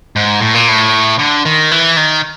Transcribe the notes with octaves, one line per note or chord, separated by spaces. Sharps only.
G#2
A2
A#2
A2
D3
D#3
E3
D#3